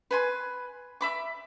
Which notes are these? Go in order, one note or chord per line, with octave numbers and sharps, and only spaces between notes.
B4 G#5 C6
E5 B5 D6